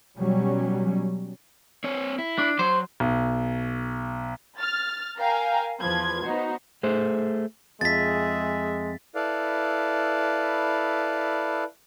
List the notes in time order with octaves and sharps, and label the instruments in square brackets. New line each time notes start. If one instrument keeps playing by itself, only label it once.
[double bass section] B2 F#3 G3 C#4
[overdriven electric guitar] C4 C#5
E4
[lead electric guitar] D4
[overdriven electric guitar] F#3 [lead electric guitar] C5
[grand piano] B1
[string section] F6 A6
A#4 F5 G5 G#5 A#5
E2 F3 B4 G#6
B3 D#4 F#4 C5
[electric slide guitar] A3 G#4 C5
[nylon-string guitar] F2 [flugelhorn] G#3 [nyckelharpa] G#4 E5 [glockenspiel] A6 B6
[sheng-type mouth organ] E4 A4 B4 D5 F5